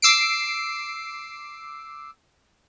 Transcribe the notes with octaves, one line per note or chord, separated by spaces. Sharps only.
D6 E6 C7 D7